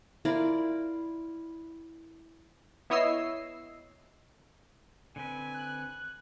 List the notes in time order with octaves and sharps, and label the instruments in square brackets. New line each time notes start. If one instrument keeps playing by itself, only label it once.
[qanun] E4 F4 A#4 D5
[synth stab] B3 E4 C#5 D#5 E6 C7
[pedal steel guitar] D3 C4 B4 [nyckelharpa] G#5
[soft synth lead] F#6